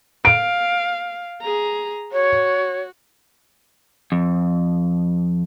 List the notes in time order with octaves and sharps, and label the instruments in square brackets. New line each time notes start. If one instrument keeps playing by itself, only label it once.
[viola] F5 [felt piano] D7
[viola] G#4 A#5
[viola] F#4 [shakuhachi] C#5
[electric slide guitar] F2